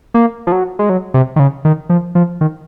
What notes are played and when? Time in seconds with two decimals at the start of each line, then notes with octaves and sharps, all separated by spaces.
0.14 A#3
0.47 F3
0.52 F#3
0.79 G#3
0.89 F#3
1.14 C3
1.36 D#3
1.39 C#3
1.65 D#3
1.90 F3
2.15 F3
2.41 D#3